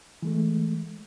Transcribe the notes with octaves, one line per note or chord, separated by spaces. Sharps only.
E3 G#3 A3